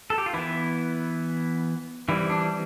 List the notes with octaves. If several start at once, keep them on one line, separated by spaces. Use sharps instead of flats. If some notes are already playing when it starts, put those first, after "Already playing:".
A4
G4
F4
E3 B3 E4
E3 G3 C4 E4
D4